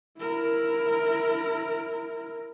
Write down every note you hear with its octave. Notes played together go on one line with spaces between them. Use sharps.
E4 A#4